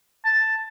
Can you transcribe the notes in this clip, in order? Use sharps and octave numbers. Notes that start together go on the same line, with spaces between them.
A5